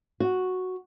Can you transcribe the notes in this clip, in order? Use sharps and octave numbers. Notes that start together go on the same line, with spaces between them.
F#4